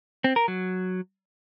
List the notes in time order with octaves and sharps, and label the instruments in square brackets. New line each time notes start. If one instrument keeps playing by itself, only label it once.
[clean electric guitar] C4
A#4
F#3